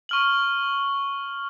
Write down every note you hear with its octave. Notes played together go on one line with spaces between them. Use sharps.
C#6 F6 F#7